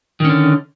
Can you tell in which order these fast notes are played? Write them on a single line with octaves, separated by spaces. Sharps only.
D#3 C#4 D3